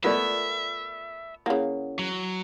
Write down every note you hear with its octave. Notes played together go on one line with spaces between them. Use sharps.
A3 B3 F4 A#4 D5 E5
C#3 A#3 E4 F#5
F#3